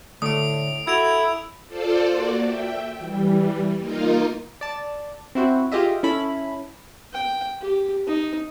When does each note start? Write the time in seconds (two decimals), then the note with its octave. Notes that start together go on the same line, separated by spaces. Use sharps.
0.22 A2 D3 A3 D5 D#6 D7
0.87 E4 F#4 A4 G#6 D7 F7
1.68 F4 A4 C5 D5
2.10 A#3 F#4 D5
2.43 E5 G5
2.99 E3 G3
3.79 A#3 D#4 F4 A#4
4.61 D5 A5
5.35 C4 E4 F#4 C5
5.72 F4 G4 G#4 D#5 E5
6.03 C#4 E4 A4 B5
7.13 G5
7.61 G4
8.07 D#4